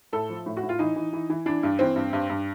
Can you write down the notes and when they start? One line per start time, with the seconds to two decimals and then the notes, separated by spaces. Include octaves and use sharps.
0.13 A2 A4
0.29 F3
0.46 A2
0.57 F#4
0.63 A2
0.69 F4
0.79 E3 D#4
0.96 E3
1.13 E3
1.30 E3
1.46 E3 D4
1.63 G2
1.79 E3 C4
1.96 G2
2.13 G2
2.29 G2